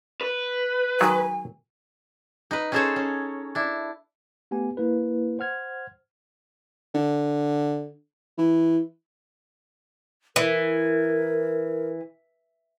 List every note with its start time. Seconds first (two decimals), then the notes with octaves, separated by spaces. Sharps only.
0.21 B4
1.01 D#3 F#3 G#3 G#5
2.51 D#4 B4
2.72 C#4 D#4 G#4 A4 C5 C#5
2.96 C#4
3.55 D4 E4
4.51 A3 B3 G4 G#5
4.77 A#3 E4 B4
5.39 C5 F#5 F6 G#6
6.94 D3
8.38 E3
10.36 E3 A#4